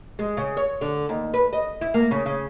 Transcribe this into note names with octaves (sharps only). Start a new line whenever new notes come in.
G#3
C#3
C#5
D3
D#2
B4
D#5
E4
A#3
C#3
C#3